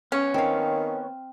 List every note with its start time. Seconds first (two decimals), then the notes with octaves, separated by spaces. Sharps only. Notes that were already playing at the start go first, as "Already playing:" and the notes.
0.12 B3 C#4 C#5
0.34 D#3 C4 F5